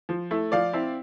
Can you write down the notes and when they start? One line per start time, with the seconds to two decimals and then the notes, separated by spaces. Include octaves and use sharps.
0.09 F3
0.31 A3 E4
0.52 F3 D5 F5
0.73 C4 E4